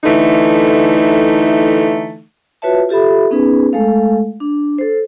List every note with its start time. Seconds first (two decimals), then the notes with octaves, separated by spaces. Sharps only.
0.04 D3 E3 A3 D#4
2.62 F4 F#4 B4 C#5 E5 A5
2.89 F4 G4 A4 E5 B5
3.31 B3 C#4 D#4 G#4 B4
3.73 G#3 A3 A4 F5
4.40 D4
4.78 A4 C5